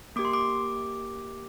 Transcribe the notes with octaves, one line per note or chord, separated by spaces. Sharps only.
A#3 G4 D6
C6
D6